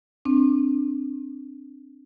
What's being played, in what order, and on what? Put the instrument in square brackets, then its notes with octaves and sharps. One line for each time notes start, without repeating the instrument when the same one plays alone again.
[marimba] C4 D4